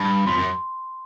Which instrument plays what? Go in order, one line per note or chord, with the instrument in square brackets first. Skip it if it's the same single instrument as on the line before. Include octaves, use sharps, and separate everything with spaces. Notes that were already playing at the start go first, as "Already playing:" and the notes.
Already playing: [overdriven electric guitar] G2 [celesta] A5 B5
[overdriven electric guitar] F2 [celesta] C6
[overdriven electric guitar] F#2